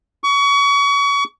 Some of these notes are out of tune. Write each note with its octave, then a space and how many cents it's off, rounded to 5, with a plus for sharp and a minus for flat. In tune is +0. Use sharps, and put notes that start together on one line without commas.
C#6 +30